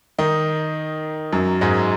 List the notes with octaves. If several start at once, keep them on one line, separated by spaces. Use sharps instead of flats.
D#3 D#4
F#2 F#3
G#2 G#3